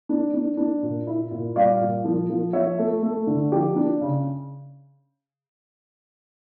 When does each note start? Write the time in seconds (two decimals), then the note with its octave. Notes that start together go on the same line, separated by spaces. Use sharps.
0.09 D4
0.34 D4
0.57 D4
0.82 A#2
1.07 E4
1.31 A#2
1.56 G3 D5 F5
1.80 A#2
2.04 F3
2.29 F3
2.53 F3 C#5 E5
2.79 A3
3.02 A3
3.27 D3
3.52 F3 G4
3.76 D4
4.01 C#3